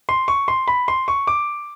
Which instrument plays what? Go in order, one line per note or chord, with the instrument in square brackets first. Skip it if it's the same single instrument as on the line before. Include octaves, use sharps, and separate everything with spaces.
[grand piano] C6
C#6
C6
B5
C6
C#6
D6